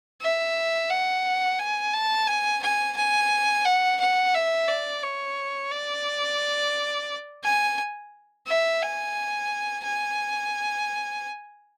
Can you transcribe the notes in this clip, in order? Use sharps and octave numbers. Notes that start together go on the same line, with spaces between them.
E5
F#5
G#5
A5
G#5
G#5
G#5
F#5
F#5
E5
D5
C#5
D5
G#5
E5
G#5
G#5